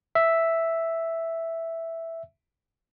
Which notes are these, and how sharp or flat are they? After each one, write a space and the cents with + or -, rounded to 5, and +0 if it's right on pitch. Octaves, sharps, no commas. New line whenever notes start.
E5 +0